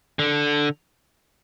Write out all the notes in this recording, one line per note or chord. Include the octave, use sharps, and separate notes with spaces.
D3